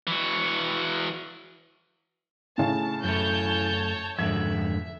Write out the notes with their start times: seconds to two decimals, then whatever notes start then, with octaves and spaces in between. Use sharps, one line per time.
0.07 E3 F#4
2.58 A2 C#3 A5
3.04 F#2 A3 C#5 A5 G6
4.19 F2 G#2 D3 E5 G#6